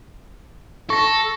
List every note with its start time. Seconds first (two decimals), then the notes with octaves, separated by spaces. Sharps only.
0.90 A4 C#6 A#6